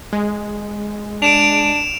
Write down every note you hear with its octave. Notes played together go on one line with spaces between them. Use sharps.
G#3
D4 D7 E7 F7